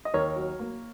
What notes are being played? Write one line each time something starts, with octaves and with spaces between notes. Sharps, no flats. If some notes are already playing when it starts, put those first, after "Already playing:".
D#5
D#2 A#4 C#5
F#3
A#3